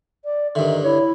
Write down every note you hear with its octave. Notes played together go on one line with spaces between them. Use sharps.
D5
G2 D3 D#3 E5
E4 C#5